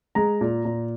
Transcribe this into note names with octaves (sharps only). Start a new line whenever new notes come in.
G#3 A#5
A#2
A#2